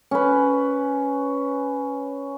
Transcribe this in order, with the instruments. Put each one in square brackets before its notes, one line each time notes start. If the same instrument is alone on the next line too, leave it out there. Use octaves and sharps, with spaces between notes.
[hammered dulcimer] C#4 B4